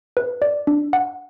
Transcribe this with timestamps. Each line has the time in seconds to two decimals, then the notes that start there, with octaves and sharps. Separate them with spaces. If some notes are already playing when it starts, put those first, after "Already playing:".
0.17 B4
0.42 D5
0.67 D4
0.93 F#5